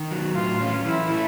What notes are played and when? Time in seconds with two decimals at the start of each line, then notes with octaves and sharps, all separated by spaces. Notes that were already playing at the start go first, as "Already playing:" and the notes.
Already playing: D#3
0.11 F#3
0.35 A2 F4
0.61 C#4
0.86 E3 E4
1.11 A3